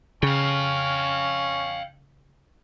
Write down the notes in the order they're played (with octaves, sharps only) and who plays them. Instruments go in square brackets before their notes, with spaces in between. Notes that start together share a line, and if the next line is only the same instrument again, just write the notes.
[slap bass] C#3 [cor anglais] C#4 [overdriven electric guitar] F5 G5